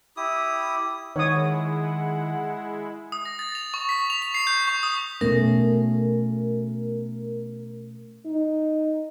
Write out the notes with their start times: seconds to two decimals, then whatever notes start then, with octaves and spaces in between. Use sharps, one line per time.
0.17 E4 G4 D#6
1.16 D#3 G#3 E4 C#5 F#5 D#6
3.12 D#6
3.25 A#6
3.39 A6
3.55 F7
3.74 C#6
3.89 B6
4.10 F7
4.22 F7
4.34 C7
4.47 G6
4.67 C#6
4.83 D#6
5.21 B2 A3 C#4 A#4
8.25 D#4